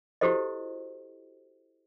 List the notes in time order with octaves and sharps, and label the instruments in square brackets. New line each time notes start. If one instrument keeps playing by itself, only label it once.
[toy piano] E4 F#4 G4 A4 C5 D#5